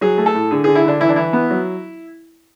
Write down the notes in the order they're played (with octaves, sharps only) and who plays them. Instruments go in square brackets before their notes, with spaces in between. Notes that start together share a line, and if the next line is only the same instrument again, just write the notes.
[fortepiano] F#3 G#4
A3
A4
A2
D3 G#4
D3 G#4
E4
D3 D4
E3 E4
D4
E3 E4
B3
F#3